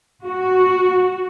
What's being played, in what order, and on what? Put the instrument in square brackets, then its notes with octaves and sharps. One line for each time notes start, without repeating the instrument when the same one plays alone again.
[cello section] F#4